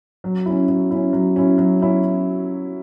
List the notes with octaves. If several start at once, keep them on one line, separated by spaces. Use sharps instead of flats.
F#3
C#4 E4
F#3
C#4 E4
F#3
C#4 E4
F#3
C#4 E4